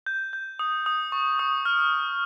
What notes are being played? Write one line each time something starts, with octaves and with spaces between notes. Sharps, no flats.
G6
G6
D#6
D#6
C#6
D#6
F6